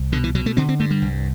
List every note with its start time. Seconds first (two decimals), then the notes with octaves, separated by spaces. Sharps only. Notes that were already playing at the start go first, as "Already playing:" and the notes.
Already playing: C2
0.12 B2 D3
0.24 E3
0.35 B2 F#3
0.46 A3
0.57 D3 C4
0.69 C4
0.80 G2 A3
0.91 G3
1.02 C2